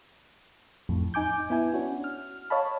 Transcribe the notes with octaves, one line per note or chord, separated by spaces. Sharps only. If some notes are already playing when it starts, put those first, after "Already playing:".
F2 A2
D#4 G#5 D6 G6
B3 E4 G#5
C#4 D4 F#4
F6
C#5 D#5 F5 A5 B5